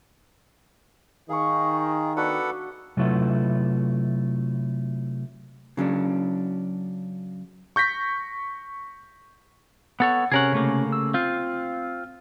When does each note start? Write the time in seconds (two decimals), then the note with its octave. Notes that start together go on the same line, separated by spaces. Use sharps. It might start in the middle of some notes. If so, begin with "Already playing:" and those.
1.29 D#3 G#4 F5 C#6
2.17 B3 D4 F#4 A4 B4 F#5
2.97 C3 F#3 A3 E4 F4 B4
5.77 C#3 F#3 C#4 D4
7.76 C#6 G6 A#6 B6
10.00 B3 A4 C#5 F#5
10.32 C3 C#4 G#4 A#4 F#5 C#6
10.52 C#3 A3 A#3
10.92 E6
11.14 C4 F4 F5